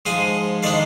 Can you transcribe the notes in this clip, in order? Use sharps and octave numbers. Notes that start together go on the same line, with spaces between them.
G#2 F3 G#3 F5 G#5
D#3 G#3 D4 D5 F5